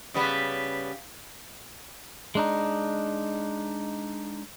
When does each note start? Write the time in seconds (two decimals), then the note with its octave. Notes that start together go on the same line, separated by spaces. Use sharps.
0.14 C#3 G3 B3
2.35 G#3 D4 D#4